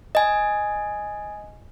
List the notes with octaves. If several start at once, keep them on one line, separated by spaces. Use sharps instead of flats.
D#5 G#5